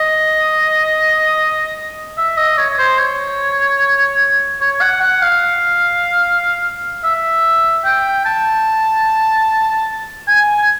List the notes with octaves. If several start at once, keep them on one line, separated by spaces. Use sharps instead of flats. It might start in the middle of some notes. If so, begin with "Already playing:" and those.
Already playing: D#5
E5
D#5
C#5
C5
C#5
C#5
F#5
F#5
F5
E5
G5
A5
G#5